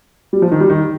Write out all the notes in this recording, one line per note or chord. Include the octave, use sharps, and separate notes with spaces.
G3
F3
D#3
G3
D#3